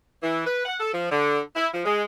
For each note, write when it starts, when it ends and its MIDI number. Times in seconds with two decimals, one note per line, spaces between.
0.23 0.43 52
0.47 0.64 71
0.66 0.75 78
0.80 0.91 69
0.92 1.07 53
1.11 1.39 50
1.56 1.67 64
1.74 1.84 53
1.86 2.02 56